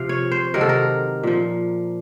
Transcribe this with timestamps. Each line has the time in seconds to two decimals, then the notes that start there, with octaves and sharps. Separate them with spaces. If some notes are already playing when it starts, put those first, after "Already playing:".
Already playing: C3 F3 F5
0.09 C#5
0.32 C5
0.54 C3 D#3 F#3 A#4
0.61 A4
0.69 A#4
1.23 A#2 F3